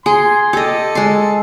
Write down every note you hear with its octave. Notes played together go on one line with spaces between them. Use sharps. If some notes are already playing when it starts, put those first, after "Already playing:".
G#4 C6
G4 A4 D#5
G#3 C6